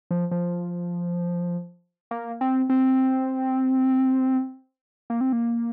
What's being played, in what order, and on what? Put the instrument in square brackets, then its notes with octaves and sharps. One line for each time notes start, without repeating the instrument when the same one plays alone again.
[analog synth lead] F3
F3
A#3
C4
C4
A#3
C4
A#3